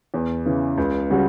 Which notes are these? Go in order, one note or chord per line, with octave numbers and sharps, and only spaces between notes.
E2
C#3 E3
C#2
C#3 G3 C#4 F#4